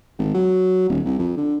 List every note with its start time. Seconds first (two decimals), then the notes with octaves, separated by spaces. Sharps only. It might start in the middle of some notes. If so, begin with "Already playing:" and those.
0.18 G#1
0.34 F#3
0.89 D#1
1.05 C2
1.18 F2
1.37 D3